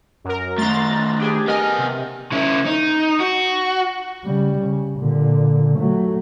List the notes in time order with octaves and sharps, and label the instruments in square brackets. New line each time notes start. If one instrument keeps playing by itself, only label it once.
[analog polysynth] F#2 A#4
[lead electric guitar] D#3 A3 [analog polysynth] A#5 C6 A6
[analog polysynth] D4 G4 G#4
[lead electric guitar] B3 G#5 [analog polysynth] A#4 D#5 F6
[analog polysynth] C3
[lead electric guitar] C#3 E4
D#4
F#4
[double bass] C#3 G3
C#3
A#2 D3
F#3 A3